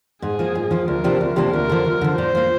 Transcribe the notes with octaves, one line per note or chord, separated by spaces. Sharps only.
G#2 G#4
F3 A#3
G#2
F3 A#3
D2 A#4
C3 F3 A#3 D4
D2
C3 F3 A#3 D4
D2 A#4
D3 F3
D2
D3 F3
A#2 C5
F3 A#3